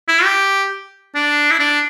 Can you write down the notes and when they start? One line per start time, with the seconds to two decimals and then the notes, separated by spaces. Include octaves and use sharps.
0.08 E4
0.24 G4
1.15 D4
1.51 E4
1.59 D4